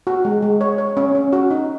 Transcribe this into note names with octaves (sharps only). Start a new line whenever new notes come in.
F#4
G#3
G#3
C#5
C#5
C#4
C#4
F#4
D#4